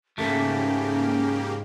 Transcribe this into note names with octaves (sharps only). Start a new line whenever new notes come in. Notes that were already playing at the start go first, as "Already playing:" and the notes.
D#2 G#2 C#3 A3 A#3 C#4 G4